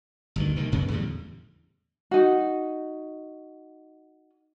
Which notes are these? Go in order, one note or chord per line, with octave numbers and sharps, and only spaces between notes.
G1 D2 D#3
C2 A#2 D#3
F1 F#2 C#3 B3
E2 A2 D3 G3
D#4 F#4